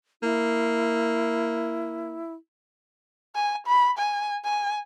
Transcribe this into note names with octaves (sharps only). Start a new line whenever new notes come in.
A#3 E4
G#5
B5
G#5
G#5